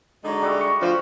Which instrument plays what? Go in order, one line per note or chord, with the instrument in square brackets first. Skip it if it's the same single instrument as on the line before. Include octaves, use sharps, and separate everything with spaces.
[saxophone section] D3 G#3 [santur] F#3 D#4
[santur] G3 F#4 E5
C#6
[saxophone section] D2 F3 [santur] F#4